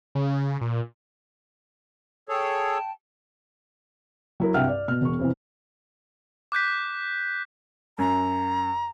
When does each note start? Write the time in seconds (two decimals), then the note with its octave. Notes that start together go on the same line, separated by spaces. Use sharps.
0.15 C#3
0.61 A#2
2.29 G#4 A4 C#5 G5 A5
4.40 F#3 E4 A#4
4.54 C2 G2 E5 F#5 G5 F6
4.69 D5
4.88 B2 F6
5.01 E1 C#6
5.19 F2 C3 E3
6.52 D6 F#6 G6 B6
7.98 F#2 A#5